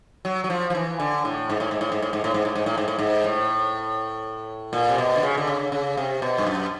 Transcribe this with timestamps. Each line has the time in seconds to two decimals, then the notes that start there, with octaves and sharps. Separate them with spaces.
0.25 F#3
0.44 F#3
0.50 F3
0.70 F3
0.75 E3
1.00 D3
1.25 A2
1.50 G#2
1.60 A2
1.71 G#2
1.81 A2
1.92 G#2
2.02 A2
2.13 G#2
2.24 A2
2.34 G#2
2.45 A2
2.55 G#2
2.66 A2
2.78 G#2
2.88 A2
2.99 G#2
3.24 A2
4.73 A#2
4.89 C3
4.98 B2
5.16 D3
5.23 C#3
5.38 D3
5.47 C#3
5.72 C#3
5.97 C3
6.22 B2
6.38 G2
6.47 F#2